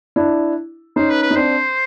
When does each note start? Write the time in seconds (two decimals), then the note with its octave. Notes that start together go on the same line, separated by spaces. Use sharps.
0.16 D4 E4
0.96 C#4 D#4 C5
1.10 B4
1.23 B4
1.31 D#4
1.36 C4 D4 C5